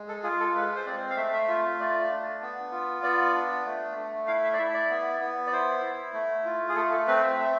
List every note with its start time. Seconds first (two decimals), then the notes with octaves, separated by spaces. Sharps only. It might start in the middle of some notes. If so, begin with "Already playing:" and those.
Already playing: G#3
0.08 A4
0.23 F4 G#4
0.40 A4
0.55 G#3 B4
0.76 C5
0.86 C4 D5
1.10 F5
1.16 A3 E5
1.33 E5
1.48 F4 E5
1.80 A3 D5
2.11 D4
2.42 B3
2.72 F4
3.03 B3 D5
3.35 D4
3.65 A3
3.97 A3
4.27 E4 F5
4.44 E5
4.53 D5
4.58 E4 E5
4.74 D5
4.90 B3
5.21 B3
5.46 D5
5.52 E4 C5
5.82 E4
6.13 A3
6.45 F4
6.69 G#4
6.76 A3 A4
6.92 A4
7.08 C4 B4
7.23 E5
7.38 A3 E5